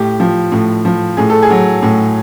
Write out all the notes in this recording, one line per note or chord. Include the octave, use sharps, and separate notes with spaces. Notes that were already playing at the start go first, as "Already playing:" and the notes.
Already playing: A2 G4
F3
A2
F3
A2 G#4
A4
G#4
F#3
A2